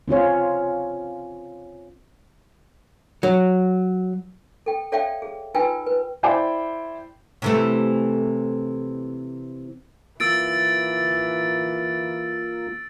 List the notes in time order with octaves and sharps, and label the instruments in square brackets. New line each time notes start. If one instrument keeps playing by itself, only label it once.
[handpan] C4 C#4 F4 C#5
[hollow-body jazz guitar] F#3
[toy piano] A4 G5
A4 C#5 D5 E5 F5 G5
G#4
D#4 F4 B4 G5 G#5 E6
B4
[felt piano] E4 C5 D5 G5 D6
[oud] C3 E3 A3
[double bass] E3 [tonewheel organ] A#3 F4 [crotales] E6 A6 D7